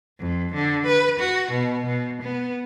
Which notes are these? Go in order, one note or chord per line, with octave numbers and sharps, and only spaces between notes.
F2
D3
B4
F#4
B2
B2
B3